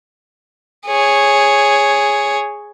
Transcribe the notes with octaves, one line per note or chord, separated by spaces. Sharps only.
G#4 C#5